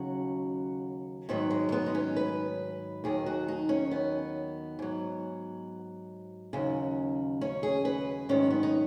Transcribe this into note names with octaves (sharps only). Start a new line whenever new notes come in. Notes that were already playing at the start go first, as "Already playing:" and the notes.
Already playing: D#2 C#3 F#3 F#4
G#2 D#3 F#3 B3
G#3
G#3
B3
D#4
C#4
B4
D#2 D#3 F#3 G#4
F#4
D#4
C#4
B3
G#2 F#3
D#2 C#3 F#3
C#4
G#4
B4
G#2 D#3 F#3 C#4
B3
D#4